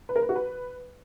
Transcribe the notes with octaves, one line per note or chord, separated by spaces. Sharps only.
B4
A#4
B4
F#4
B4